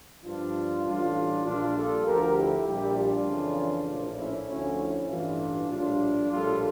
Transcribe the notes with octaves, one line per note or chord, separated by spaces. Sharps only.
G2 F3 D4 F4
A1 A2 E3 G3 D4 F4
A#1 A#2 G3 D4 F4
F4 A4
D2 D3 F3 G4 A#4
E4 G4
A#1 A#2 G3 E4 G4
D4 F4
F2 C#3 E3
A#1 A2 F3 A#3 D4
C#4 E4
D2 D3 F3 C#4 E4
C#4 E4
A1 G2 E3 D4 F4
A#1 A2 G3 D4 F4
A#1 A2 G3 F4 A4